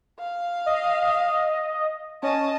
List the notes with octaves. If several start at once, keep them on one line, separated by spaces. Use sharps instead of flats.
F5
D#5
C#4 D#5 A5